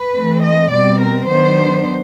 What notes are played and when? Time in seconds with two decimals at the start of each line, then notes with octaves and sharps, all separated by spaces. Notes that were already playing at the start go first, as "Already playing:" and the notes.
Already playing: B4
0.13 E3 A3 C4
0.42 D#5
0.70 B2 G3 C4 D5
0.99 A#4
1.28 D#3 F#3 B3 D4 C5